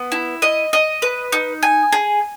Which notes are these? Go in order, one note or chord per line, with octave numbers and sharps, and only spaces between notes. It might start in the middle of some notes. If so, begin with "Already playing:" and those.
Already playing: B3
E4
D#5
D#5
B4
D#4
G#5
G#4